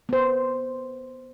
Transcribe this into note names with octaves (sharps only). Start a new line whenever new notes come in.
B3 C5